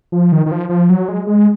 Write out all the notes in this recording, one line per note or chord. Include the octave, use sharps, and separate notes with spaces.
F3
D#3
D#3
F3
F3
F#3
G#3
G#3